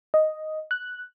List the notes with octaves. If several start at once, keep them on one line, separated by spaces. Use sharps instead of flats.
D#5
F#6